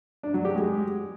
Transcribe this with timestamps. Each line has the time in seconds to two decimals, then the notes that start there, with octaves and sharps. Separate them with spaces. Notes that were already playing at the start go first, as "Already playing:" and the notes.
0.23 D4
0.34 F#3
0.45 G4
0.55 G#3